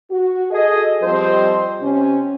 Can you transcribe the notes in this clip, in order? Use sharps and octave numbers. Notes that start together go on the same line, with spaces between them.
F#4
G#4 A4 D#5
F3 G3 C4 C5 D#5
C3 C4 C#4